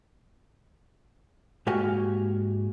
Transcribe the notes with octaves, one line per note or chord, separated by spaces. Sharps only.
G#2 A#3 F#4 G4 F5 G#5